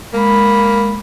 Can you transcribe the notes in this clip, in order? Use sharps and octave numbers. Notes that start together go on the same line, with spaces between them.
G#3 A#3 B5